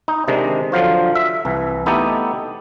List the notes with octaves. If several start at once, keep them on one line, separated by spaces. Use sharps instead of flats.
D#4
C3 D#3 G#3 D4
D3 F3 F#3 F4 C5
E5
C2 E3
A3 B3 D#4 E4 G4 A4